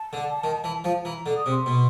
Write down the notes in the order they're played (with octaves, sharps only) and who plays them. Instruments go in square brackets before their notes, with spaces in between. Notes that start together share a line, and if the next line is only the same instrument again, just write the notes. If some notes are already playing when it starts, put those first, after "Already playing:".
Already playing: [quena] A5
[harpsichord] D3
D#3
E3
F3
[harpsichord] E3 [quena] A#5
[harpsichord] D3
[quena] D#6
[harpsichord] C3
[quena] C6
[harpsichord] B2